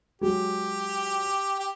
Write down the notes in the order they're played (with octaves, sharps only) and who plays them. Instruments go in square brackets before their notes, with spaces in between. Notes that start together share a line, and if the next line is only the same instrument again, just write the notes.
[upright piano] F#3 G#3 [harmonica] G4
[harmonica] G4